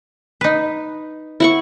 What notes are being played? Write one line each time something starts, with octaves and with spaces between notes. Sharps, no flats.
D#4 B4
E4 F#5 C#6